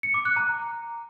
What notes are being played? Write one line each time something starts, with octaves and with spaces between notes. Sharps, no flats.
C#7
D6
F#6
A#5